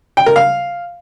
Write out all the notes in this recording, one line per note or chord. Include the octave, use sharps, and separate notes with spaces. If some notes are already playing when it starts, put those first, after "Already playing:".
G5
A#4
F5